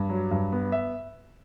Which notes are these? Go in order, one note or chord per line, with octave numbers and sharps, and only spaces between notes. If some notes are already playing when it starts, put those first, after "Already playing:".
Already playing: G2
F#3
G2
B3
E5